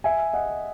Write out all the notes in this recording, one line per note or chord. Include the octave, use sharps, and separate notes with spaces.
E5 G#5
D#5 F#5